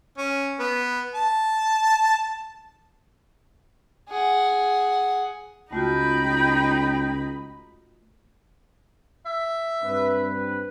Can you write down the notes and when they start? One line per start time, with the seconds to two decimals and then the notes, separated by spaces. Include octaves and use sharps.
0.17 C#4
0.59 B3
1.15 A5
4.09 G#4 F#5
5.73 C#2 A3 D#4 F4 F#4 G5 B5
9.26 E5
9.82 G2 C4 B4